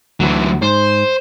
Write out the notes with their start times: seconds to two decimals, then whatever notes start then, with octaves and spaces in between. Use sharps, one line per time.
0.20 D2 E3 F#3
0.62 G#2 C5